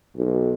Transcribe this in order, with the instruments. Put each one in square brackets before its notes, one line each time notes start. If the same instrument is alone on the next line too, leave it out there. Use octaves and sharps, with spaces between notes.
[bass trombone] B1